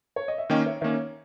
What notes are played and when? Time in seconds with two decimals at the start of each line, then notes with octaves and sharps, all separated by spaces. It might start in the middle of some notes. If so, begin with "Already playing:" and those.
0.16 C#5
0.28 D#5
0.38 E5
0.50 D#3 A#3 C#4 D#5 G5
0.66 C#5 E5
0.81 D#3 A#3 C#4 C#5 E5